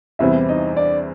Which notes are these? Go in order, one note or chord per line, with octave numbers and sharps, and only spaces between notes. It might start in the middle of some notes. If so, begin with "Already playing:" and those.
E2 C3 E3 G3 C4 E4 E5
D#4 D#5
D4 D5